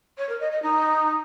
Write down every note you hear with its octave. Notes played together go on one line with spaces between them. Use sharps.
C#5
A#4
D#5
D#5
D#4